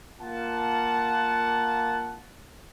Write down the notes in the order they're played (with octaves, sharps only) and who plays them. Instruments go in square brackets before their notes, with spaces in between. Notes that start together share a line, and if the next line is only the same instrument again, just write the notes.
[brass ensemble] A#3 F4 F#5 A5